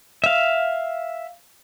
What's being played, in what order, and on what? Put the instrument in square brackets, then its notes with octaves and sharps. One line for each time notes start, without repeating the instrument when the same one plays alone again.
[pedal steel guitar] E5 F5